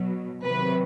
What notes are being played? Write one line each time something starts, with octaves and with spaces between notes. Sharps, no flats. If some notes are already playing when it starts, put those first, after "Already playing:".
Already playing: B2 F#3
C3 D#3 F#3 B4